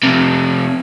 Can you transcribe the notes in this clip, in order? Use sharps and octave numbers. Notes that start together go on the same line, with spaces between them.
F2 C3